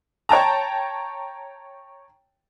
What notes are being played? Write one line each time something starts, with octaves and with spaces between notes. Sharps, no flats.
C#5 G5 A5 A#5